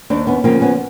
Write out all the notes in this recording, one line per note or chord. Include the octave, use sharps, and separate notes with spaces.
D#2 C4 D4
B3 C#4
C#3 F3 A#3 C4
B3 C#4